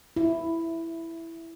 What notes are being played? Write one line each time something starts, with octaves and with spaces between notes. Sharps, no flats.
E4